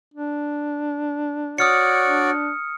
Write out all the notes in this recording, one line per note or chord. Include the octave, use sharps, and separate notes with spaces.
D4
F#4 C#5 D5 D#6 F6 C#7
D4